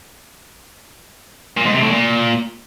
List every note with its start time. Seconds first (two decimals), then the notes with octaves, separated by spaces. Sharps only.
1.57 A#2
1.65 G#2
1.74 C3
1.82 A2
1.90 A#2